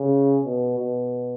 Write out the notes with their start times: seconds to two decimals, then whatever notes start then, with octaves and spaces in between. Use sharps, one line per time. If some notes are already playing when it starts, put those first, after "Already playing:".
Already playing: C#3
0.44 B2
0.79 B2